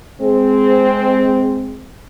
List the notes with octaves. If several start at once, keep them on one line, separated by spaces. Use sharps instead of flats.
G#3 C4 G#4